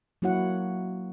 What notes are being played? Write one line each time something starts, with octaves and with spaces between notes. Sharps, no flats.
F#3 A#3 E4 F#4 C#5 F#5